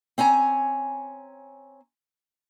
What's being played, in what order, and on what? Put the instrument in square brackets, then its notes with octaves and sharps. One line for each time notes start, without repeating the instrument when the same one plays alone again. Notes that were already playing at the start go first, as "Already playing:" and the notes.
[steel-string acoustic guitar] C4 C#4 G#5 A#5